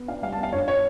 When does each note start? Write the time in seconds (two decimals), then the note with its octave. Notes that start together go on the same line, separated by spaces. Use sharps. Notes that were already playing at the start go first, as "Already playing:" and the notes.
Already playing: B3
0.08 D4 F5
0.22 G3 F5
0.32 A5
0.38 B3
0.43 F5
0.53 G2 C#5
0.68 C#5